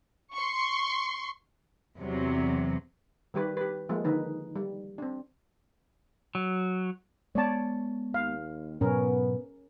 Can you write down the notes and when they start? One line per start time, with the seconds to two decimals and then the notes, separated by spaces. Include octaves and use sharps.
0.33 C6 C#6
1.98 E2 C3 F#3
3.34 D#3 G3 G4 B4
3.57 G4 B4
3.89 F3 G#3 A#3
4.04 D3 D#3 D#4 B4
4.56 G3
4.98 C4 D4
6.35 F#3
7.35 G#3 B3 C#5 D5 A5
8.14 D#2 F5
8.81 G#2 B2 F#3 B3 C#4 A#4